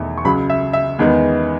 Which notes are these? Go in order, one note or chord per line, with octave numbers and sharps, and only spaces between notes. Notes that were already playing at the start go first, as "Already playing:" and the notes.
Already playing: E1 E2 D#3 A3
C#6
C#2 C#3 F#3 B5
E5
E5
E2 D#3 G#3 B3